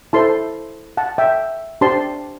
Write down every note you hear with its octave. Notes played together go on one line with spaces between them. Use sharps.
E4 A4 C5 A5 C6
F#5 A5
E5 G5
D4 G4 C5 A5 C6